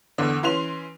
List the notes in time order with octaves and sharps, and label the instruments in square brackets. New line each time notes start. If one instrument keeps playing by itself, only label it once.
[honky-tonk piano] E2 D3
E3 C#4 C6 F7